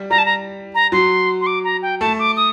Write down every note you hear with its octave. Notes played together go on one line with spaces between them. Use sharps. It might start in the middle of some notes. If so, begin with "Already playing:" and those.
Already playing: G3
G3 A#5
A5
A#5
A#5
F#3 C6
C6
D6
A#5
G5
A3 A5
D6
D#6